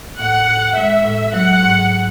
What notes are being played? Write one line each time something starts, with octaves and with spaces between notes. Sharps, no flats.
A2 F#5
A2
G#3 E5
A2
F#3 F#5
G#2